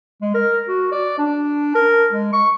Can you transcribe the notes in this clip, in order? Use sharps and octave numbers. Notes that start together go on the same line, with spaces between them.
G#3
A#4
F#4
D5
D4
A#4
G#3
C#6